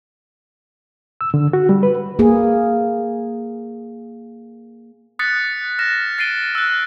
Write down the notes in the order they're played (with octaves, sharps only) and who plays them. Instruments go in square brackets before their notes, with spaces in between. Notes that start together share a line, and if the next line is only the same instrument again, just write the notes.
[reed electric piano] E6
D3
F#4
G3
B4
[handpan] A#3 G#4
[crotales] D#6 F#6 A6 B6 C#7
F6 A#6 E7
A6 C7 D7 D#7 G7
E6 F#6